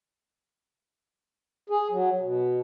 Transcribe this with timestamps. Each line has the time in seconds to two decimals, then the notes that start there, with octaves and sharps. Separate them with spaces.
1.70 G#4
1.91 F#3
2.20 B2